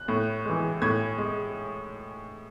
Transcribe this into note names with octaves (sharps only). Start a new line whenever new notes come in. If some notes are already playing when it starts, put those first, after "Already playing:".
Already playing: F#6
A2
E3 G#3
A2 G#6
G#3